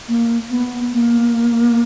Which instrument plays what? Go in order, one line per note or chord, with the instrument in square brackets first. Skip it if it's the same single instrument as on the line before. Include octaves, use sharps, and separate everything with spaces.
[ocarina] A#3
B3
A#3